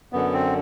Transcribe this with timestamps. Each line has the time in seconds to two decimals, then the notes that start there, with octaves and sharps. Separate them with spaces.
0.13 F#2 D3 B3
0.33 C4